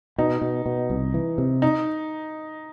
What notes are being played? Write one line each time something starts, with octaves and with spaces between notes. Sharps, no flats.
B2 D#4
B2
B2
C2
E3
C3
D#4